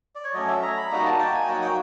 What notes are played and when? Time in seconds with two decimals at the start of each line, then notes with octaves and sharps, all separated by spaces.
0.15 D5
0.24 C#5
0.34 F#3 A3 C#4 D#5
0.48 E5
0.63 A#5
0.77 B5
0.91 G3 A#3 D#4 F#4 A#5
1.05 A5
1.19 G5
1.34 G#5
1.47 F#3 A#3 D#4 F#4 G5
1.62 G5